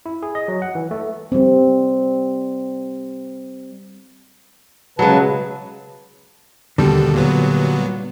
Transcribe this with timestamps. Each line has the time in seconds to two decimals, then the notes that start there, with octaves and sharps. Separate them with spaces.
0.06 E4
0.23 G#4
0.35 D#5
0.48 F#3
0.62 F#5
0.75 E3
0.91 A3
1.32 G3 C4
4.99 C#3 F#3 G#3 B4 A5
6.78 D#2 B2 D3 G3 A4
7.14 A#2 F#3 B3